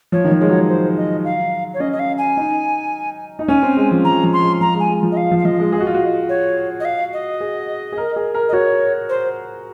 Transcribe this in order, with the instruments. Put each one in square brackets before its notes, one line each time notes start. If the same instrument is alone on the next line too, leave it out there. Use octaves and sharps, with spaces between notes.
[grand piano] F3 [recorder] C#5
[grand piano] D#3
F3
[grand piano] G#3 [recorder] C#5
[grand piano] F#3
[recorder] C5
D#5
F5
C#5
[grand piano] C#4 [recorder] D#5
[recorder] D#5
F5
G#5
[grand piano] D#4
D#4
[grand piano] C#4 [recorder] G#5
[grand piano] C4
G#3
F3
[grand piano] F3 [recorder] A#5
[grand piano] F3
[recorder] C6
[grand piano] G#3
[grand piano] F3 [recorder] A#5
[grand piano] G#3
[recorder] G#5
[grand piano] G#3
F3
[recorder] D#5
F5
[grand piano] F3
[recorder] F5
[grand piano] F3 [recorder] D#5
[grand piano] G#3
G#4
F#4
F4
F#4
[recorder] C#5
D#5
F5
D#5
[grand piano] G#4
G#4
A#4
G#4
A#4
[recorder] D#5
[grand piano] F#4 [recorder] C#5
[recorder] C5